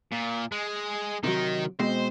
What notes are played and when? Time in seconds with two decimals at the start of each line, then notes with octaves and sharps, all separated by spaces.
0.12 A#2
0.52 G#3
1.24 C3 D#3 F#3 D#4
1.80 B2 G#3 C4 C5